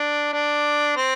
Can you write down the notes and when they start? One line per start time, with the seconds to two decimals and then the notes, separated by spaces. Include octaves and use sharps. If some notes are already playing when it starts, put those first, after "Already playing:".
Already playing: D4
0.33 D4
0.97 C4